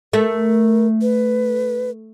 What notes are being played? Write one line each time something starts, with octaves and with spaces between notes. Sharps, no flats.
A3 A#4
B4